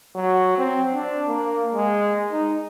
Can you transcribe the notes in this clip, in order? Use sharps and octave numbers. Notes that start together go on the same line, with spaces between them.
F#3
C4
D4
A#3
G#3
D#4